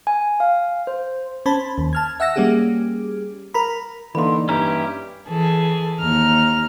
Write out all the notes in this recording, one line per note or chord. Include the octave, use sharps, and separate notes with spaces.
G#5
F5
C5
C#4 C5 A5 B5
D#2
A5 F6 G#6
E5 F#5 E6 A#6
G3 A#3 C#4 G4 G#4
A#4 A#5 B5
D3 E3 A#3 D#4 B5 C6
G2 C#4 E4 G4 A#5
E3 G#4 A4
D#2 A#5 F6